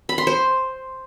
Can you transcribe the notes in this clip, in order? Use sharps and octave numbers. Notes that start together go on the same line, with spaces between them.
B5
C6
C5